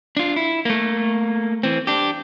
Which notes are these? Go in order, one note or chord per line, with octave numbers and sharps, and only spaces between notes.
D4 F4
E4
A3 A#3
E3 C4
D4 G4